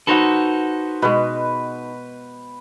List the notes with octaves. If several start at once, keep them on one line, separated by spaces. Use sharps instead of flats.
D#4 F#4 A4 B4 C5 F#5
B2 G#3 B4